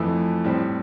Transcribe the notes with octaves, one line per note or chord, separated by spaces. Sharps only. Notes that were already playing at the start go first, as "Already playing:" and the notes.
Already playing: F2 E3 A3 E4
A2 G3 C4